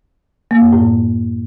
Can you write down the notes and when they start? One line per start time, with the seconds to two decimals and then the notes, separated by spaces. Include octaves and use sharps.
0.51 A#3
0.62 F#2
0.73 A2